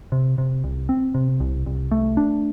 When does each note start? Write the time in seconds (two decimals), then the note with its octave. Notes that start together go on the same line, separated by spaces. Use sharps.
0.12 C3
0.38 C3
0.64 C2
0.89 C4
1.14 C3
1.40 C2
1.66 C2
1.91 A3
2.17 D4